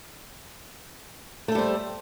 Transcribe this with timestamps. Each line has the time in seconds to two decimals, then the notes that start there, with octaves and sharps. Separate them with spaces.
1.48 A3
1.52 A4
1.55 G3
1.58 C5